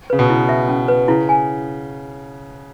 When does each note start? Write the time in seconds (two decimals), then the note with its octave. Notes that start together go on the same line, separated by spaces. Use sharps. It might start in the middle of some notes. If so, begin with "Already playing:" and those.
0.10 C#3 B4
0.19 B2
0.30 E4
0.49 E5
0.69 C#4
0.88 B4
1.08 C#3 E4
1.29 G#5